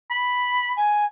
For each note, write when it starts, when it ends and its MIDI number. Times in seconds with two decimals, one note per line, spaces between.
0.10 0.74 83
0.77 1.05 80